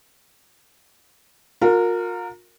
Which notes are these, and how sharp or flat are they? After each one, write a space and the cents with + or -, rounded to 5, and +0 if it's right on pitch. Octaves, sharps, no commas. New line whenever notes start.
F4 +45 A#4 -15